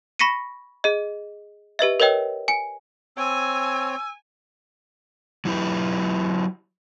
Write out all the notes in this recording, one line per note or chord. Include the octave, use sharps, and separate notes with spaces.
B5 C#6 A#6 B6 C#7 D#7
G#4 D#5
G4 B4 D#5 E5
A#4 B4 C#5 D#5 G5
G#5 C#7
C4 C#5 G#5 E6
F#3 E4 G4 B4